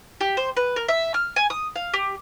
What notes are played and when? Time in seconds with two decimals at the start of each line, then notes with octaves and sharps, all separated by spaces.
0.21 G4
0.37 C5
0.57 B4
0.76 A#4
0.88 E5
1.14 F6
1.36 G#5
1.50 D#6
1.76 F5
1.94 G4